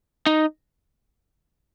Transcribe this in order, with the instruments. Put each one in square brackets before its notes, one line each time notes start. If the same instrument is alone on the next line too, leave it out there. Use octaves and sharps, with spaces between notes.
[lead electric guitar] D#4